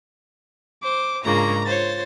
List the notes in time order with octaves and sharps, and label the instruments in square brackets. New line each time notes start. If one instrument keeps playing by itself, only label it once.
[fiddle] C5 [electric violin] D6
[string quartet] G#2 C#3 A#3 [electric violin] D4 F4 [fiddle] A#5
[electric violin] F4 [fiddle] C5 C#5 [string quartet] A6